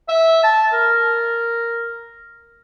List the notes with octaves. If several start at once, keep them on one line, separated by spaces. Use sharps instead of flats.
E5
A5
A#4